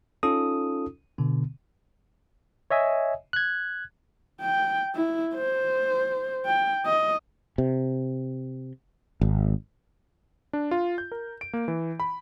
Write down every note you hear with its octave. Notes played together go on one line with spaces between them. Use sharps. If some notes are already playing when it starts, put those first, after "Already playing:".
C#4 D#4 F4 A4 D#6
B2 D3 B3
C#5 D#5 E5 G#5
F#6 G#6
G5
E4
C5
G5
D#5
C3
G#1
D4
F4
G6
A#4
D7
A#3
E3
B5